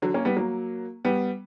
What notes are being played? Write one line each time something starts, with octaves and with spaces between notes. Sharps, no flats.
D3 F#3
A#3 C#4
G3 B3
F#3 A#3
G3 B3